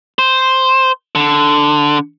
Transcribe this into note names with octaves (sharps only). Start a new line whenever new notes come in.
C5
D3